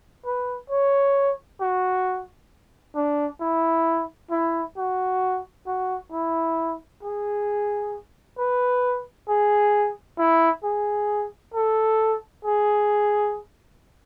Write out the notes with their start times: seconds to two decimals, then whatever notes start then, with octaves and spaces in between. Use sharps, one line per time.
0.26 B4
0.70 C#5
1.61 F#4
2.95 D4
3.41 E4
4.31 E4
4.77 F#4
5.67 F#4
6.12 E4
7.03 G#4
8.38 B4
9.28 G#4
10.19 E4
10.63 G#4
11.54 A4
12.45 G#4